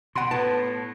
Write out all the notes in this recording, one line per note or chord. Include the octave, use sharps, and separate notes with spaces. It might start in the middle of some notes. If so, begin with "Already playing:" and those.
B2 F#5 B5 C6
A2 B3 A5